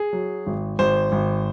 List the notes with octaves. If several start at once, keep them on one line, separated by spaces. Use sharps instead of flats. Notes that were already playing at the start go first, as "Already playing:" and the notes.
Already playing: G#4
F#3
G#1
G#1 C5
G#1